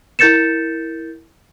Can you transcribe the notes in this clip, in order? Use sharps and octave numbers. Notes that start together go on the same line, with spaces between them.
E4 A#4 G6 A6 C#7 E7